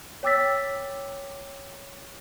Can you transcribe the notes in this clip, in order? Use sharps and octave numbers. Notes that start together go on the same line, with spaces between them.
C#5 G5 D6 E6 A6 B6